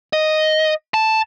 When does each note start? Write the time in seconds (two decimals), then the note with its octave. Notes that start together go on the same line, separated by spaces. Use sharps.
0.13 D#5
0.94 A5